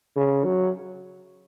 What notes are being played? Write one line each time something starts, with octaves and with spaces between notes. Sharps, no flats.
C#3
F#3